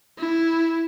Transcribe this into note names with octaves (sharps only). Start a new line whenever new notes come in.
E4